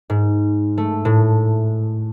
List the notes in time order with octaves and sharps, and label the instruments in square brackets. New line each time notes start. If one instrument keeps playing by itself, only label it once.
[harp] G#2
A3
A2